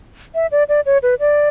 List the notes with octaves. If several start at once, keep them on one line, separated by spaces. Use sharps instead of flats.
E5
D5
D5
C#5
B4
D5